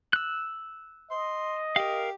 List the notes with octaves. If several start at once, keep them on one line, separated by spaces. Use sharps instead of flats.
E6 F#6
D#5 C6
G4 A#4 F5